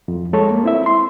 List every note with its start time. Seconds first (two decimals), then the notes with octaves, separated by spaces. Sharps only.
0.08 F2
0.33 G#3 A4 C#5
0.51 A#3
0.64 C4 E4 E5
0.86 C6